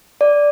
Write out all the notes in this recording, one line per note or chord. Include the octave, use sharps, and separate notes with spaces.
D5